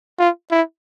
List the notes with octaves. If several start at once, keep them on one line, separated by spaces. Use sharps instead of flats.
F4
E4